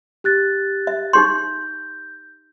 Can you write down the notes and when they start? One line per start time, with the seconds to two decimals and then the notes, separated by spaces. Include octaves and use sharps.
0.24 G4 F#6 A6
0.87 E5
1.13 D#4 G4 C6 G6